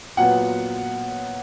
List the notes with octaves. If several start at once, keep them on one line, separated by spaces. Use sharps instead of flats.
A#2 F#3 B3 F#5